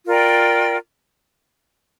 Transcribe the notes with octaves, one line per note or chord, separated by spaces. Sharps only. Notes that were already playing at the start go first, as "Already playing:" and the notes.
F4 A#4 D5 G5